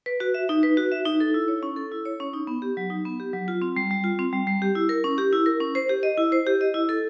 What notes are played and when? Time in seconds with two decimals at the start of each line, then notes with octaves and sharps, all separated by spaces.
0.06 B4
0.20 F#4
0.34 E5
0.49 D#4
0.63 B4
0.77 F#4
0.92 E5
1.06 D#4
1.20 A4
1.34 E4
1.48 C#5
1.63 C#4
1.76 A4
1.92 E4
2.05 C#5
2.20 C#4
2.33 D#4
2.47 B3
2.62 G4
2.77 F#3
2.90 D#4
3.05 B3
3.20 G4
3.33 F#3
3.48 F4
3.62 C4
3.76 G3
3.91 G3
4.04 F4
4.19 C4
4.33 G3
4.47 G3
4.62 G4
4.75 E4
4.89 A#4
5.04 C#4
5.18 G4
5.33 E4
5.46 A#4
5.61 C#4
5.75 C5
5.89 G4
6.03 D#5
6.18 E4
6.32 C5
6.46 G4
6.61 D#5
6.74 E4
6.89 A4